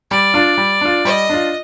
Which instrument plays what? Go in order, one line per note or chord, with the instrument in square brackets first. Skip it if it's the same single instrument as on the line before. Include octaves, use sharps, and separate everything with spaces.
[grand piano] G3 [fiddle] D5
[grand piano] D4 F4
G3
D4 F4
[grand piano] G3 [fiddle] D#5
[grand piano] D4 F4